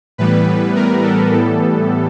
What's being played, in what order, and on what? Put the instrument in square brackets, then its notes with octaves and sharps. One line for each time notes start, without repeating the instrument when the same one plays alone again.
[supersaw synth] A2 E3 G3 B3 B4
A#4
A4
A2 E3 G3 B3 A4